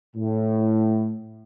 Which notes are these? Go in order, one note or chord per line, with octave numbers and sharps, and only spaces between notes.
A2